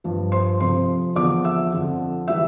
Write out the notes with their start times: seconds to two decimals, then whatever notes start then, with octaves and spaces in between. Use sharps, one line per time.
0.04 G2 F3
0.32 C5 C6
0.60 F2 C3 F3 C5 C6
1.16 E2 D3 F3 D5 D6
1.44 E5 E6
1.72 F2 D3 F3
2.28 E3 G3 E5 E6